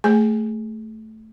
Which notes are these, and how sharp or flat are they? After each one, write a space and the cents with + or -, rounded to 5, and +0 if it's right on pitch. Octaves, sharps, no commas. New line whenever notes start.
A3 +0 G#4 +0 G#5 +0